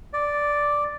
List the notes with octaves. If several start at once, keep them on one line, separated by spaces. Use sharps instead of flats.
D5